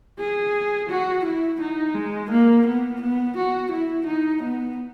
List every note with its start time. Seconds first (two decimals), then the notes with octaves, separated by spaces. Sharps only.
0.19 G#4
0.89 F#4
1.25 E4
1.61 D#4
1.95 G#3
2.31 A#3
2.66 B3
3.02 B3
3.37 F#4
3.71 E4
4.06 D#4
4.43 B3